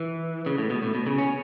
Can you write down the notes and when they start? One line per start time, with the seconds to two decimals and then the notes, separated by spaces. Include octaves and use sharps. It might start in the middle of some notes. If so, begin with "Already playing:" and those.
Already playing: E3
0.46 C#3
0.58 A2
0.70 B2
0.82 A2
0.95 B2
1.06 C#3
1.18 C#4